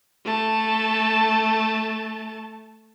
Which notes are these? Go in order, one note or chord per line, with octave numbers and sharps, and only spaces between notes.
A3 A5